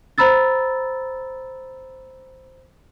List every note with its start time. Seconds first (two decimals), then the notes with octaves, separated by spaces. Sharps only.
0.18 C5 A#5 B5 E6 A6